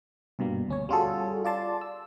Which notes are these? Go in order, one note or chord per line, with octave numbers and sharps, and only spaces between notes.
G2 B2 G3 A#3
D2 C#4 C#5
G3 C#4 F4 F#4 G#4 A4
F4 D5 A5 C6
E6